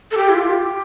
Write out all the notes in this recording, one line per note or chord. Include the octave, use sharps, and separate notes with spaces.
A4
G4
E4
F4
G4